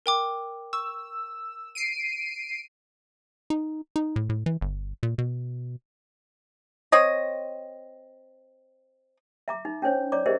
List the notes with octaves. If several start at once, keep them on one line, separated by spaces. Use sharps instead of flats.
A#4 G5 D6
C#6 E6
C7 D7 D#7
D#4
D#4
A2
A2
E3
G1
A#2
B2
C4 C#5 D#5
E5 A#5 D6
D#4
C#4 D4 C5 C#5
C#5 D5 A#5 D6
G4 G#4 A#4 C5 D#5 E5